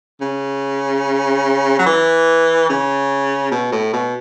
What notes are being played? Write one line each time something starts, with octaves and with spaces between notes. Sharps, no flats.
C#3
F#3
E3
C#3
B2
A2
B2